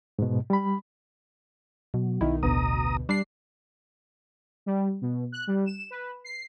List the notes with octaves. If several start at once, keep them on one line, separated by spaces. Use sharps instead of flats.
G#2 B2
G3 B5
B2 F#3
B1 D#3 E4
A1 D2 B2 A#5 D#6
G3 D4 C7
G3
B2
F#6
G3
E7
B4
C7